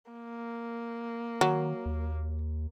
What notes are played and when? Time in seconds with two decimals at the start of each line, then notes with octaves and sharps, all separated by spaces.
0.11 A#3
1.41 D#3 F#3
1.86 D#2